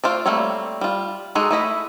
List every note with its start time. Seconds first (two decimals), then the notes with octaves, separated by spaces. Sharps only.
0.04 A3 F4 C5 D5
0.26 G3 A3 A#3 C4 C#5
0.81 G3 F4
1.35 G#3 D#4 F#4 G#4 A4
1.51 A3 E4 D#5 B5